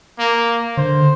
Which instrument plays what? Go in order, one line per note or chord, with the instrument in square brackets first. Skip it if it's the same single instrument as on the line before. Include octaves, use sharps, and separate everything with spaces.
[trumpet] A#3
[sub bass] D3 [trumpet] C5